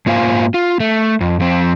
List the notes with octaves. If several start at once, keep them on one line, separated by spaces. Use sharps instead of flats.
G#2 A#3 F4 C5 F5 G#5
F4
A3
F2
F2 C4